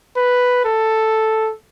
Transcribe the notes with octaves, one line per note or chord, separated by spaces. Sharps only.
B4
A4